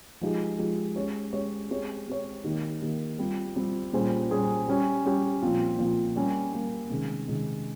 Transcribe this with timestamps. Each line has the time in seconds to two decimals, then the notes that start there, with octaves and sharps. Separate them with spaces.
0.21 F3 G#3 D#4 G4
0.59 F3 G#3 D#4 G4
0.96 G#3 C#4 G4 C#5
1.33 G#3 C#4 G4 C#5
1.70 G#3 C4 G4 C#5
2.08 G#3 C4 G4 C#5
2.44 D#3 A#3 D#4 G4
2.82 D#3 A#3 D#4 G4
3.19 G3 C4 F4
3.56 G3 C4 F4
3.93 A#2 G3 C#4 G#4 C5
4.30 A#2 G3 C#4 G#4 C5
4.67 G3 C#4 G4
5.05 G3 C#4 G4
5.42 A#2 F3 C4 F4
5.79 A#2 F3 C4 F4
6.16 G3 A#3 C#4
6.53 G3 A#3 C#4
6.90 C3 D#3 G#3 C#4
7.28 C3 D#3 G#3 C#4